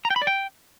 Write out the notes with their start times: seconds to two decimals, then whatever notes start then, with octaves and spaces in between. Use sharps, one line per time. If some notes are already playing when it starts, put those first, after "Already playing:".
0.05 A#5
0.10 G5
0.16 B5
0.22 D5
0.27 G5